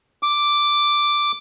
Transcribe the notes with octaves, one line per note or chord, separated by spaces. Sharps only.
D6